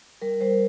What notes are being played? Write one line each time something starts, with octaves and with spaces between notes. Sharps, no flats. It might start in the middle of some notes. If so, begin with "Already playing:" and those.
G3 A#4
G3 C5